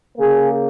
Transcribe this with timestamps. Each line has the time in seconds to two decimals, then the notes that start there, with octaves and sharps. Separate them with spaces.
0.18 C#3 A#3 G#4